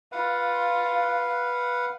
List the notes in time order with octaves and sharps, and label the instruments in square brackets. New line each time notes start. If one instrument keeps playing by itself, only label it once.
[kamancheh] F4 [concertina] B4 F5 F#5